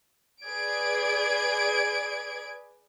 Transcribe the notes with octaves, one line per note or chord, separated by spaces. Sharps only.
G#4 B4 D5 G#6 D7